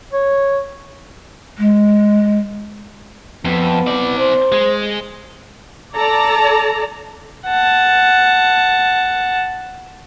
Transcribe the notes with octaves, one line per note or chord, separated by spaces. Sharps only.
C#5
G#3
F2 B3
C4 D5
C5
G#3
A4 D5 A5 A#5
F#5 A5